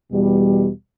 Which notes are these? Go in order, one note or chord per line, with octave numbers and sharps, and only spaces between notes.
E2 B2 G3